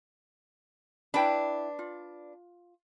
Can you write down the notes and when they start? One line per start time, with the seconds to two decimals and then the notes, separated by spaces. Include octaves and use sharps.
1.14 D4 E4 B4 G5 B5
1.79 F4